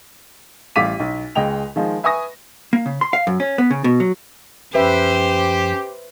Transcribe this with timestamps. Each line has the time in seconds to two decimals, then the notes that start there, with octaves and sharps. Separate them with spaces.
0.76 A1 G3 F5 D6 B6 D#7
1.00 B1
1.35 C#2 G#3 D#5 G5 F7
1.76 D#3 F3 G#3
2.03 B4 E5 G#5 C#6 D#6 A#6
2.73 A#3
2.86 C#3
3.01 C6
3.13 F5
3.27 F#2
3.40 C#4
3.58 B3
3.71 C#3
3.84 B2
4.00 F#3
4.75 F#2 F3 C#4 G4 B4 C5 E5